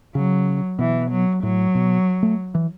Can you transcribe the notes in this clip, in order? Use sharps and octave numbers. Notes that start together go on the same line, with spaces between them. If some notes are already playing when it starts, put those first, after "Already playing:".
C#3 F#3
B2 E3
F#3
A2 F#3
B2
A3
E3